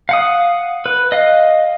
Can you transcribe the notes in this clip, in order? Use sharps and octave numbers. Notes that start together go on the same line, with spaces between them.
F5 F#5 D#6
B4
D#5 F5